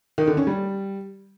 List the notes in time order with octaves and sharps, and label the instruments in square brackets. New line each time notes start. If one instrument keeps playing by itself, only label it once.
[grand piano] D#3
D3
C#4
G3